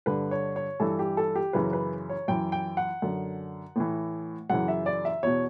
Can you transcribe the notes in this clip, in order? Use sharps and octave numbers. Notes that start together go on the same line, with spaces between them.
G2 D3 B4
C#5
C#5
G2 E3 A4
G4
A4
G4
F#2 C#3 E3 B4
B4
C#5
F#2 E3 G5
G5
F#5
F#2 D3
A2 E3
F#2 C#3 E3 F#5
E5
D5
E5
E2 B2 C#5